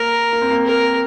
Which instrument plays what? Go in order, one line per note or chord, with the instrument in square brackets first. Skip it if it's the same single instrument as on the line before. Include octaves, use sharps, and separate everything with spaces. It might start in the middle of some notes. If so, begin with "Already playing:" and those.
Already playing: [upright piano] A#3 [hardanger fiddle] A#4
[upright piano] A#3
C4
A#3
[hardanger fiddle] A#4